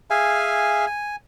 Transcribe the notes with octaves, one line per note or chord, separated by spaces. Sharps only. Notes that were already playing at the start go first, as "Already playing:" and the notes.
G#4 E5 F5 G#5
G#5